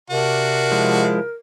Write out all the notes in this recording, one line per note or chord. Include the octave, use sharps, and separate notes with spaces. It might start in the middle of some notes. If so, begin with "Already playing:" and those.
C3 D4 F#4 A#4
F3 G#3 E4